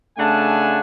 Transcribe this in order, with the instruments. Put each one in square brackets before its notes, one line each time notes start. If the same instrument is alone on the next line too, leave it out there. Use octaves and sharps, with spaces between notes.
[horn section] C#3 A3 D4 F#5 G#5 A5